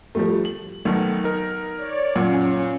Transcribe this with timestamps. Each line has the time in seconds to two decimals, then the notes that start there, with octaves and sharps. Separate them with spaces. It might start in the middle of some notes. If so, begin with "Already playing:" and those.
0.15 F3 G3 A3
0.45 F#7
0.85 B1 D#3 A3
1.24 D#4 A#4
1.77 C#5 D5
2.16 F#2 A#2 C#4